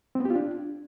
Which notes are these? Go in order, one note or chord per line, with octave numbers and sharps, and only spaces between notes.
C4
B3
G4
F4
D4